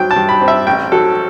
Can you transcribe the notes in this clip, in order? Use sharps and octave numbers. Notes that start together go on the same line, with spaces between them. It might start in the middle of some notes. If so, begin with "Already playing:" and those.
Already playing: G2 F#3 C4 G5
A5
G2
B5
C4
E5
A1 G5
F#3 A4